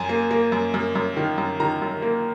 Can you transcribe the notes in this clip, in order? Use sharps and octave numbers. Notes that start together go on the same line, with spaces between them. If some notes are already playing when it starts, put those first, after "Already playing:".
Already playing: F#2 G#5
A#3
A#3
F#2
F#2
F#2
D#3
F#2
D#3 A#5
F#2
A#3